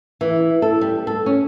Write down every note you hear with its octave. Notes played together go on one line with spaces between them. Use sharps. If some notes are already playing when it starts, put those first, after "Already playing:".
E3
A4
G3
A4
C#4